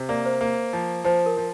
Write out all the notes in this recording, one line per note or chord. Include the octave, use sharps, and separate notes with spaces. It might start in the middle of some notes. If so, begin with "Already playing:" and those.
Already playing: C3
A#3 D5
C5
A#3
F3
F3 C5
A#4
F3